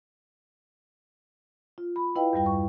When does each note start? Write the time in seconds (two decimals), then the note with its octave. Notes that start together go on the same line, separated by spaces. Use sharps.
1.78 F4
1.96 B5
2.16 E4 B4 D#5 F5 G5
2.33 E2 G2 G3 G5
2.46 C#6